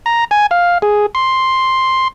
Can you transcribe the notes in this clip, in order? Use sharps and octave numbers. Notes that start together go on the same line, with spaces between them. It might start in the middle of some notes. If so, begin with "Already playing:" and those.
A#5
G#5
F5
G#4
C6